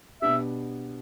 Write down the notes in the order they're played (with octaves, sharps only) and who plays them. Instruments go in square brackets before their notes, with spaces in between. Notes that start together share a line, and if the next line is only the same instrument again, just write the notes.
[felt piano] B2 B3 D4 G4 [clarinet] E5